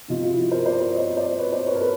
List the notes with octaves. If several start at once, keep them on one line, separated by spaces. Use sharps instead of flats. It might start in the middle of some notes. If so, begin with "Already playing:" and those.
C3 F3 D#4 F4
F4
E4 F#4
A#4 C5
C5 D5
C5 D5
C#5 D#5
C5 D5
B4 C#5
C5 D5
B4 C#5
A#4
A4 B4